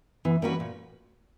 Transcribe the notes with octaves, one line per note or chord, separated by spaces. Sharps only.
E3 B3
G3 A#3 C#4 F#4 B4
A#2